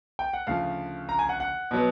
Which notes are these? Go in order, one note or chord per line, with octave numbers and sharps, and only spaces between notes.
G5
F#5
D2 C#3 F3 F5
A#5
G#5
F#5
F#5
B2 F#3 B3